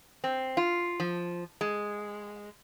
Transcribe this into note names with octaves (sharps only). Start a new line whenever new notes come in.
C4
F4
F3
G#3